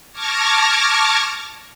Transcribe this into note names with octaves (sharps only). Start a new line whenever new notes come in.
A5 C#6 D6 F6 G#6 A#6